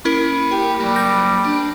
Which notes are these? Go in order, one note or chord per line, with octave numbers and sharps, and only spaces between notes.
A#3 C#4 E4 A#4 B5
G4 A#4
F#3 G3 A#3
G6 A#6 D7
D4